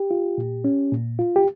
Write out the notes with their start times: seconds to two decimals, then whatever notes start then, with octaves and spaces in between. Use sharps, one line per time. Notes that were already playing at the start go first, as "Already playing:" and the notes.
Already playing: G4
0.11 F4
0.38 A#2
0.64 C#4
0.92 A#2
1.19 F4
1.36 G4